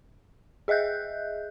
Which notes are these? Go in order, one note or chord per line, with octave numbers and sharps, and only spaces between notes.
G#4 D#5 E5 F#6 G6